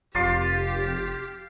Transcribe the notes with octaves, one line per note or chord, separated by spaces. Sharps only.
F1 F4 G4 C6 D6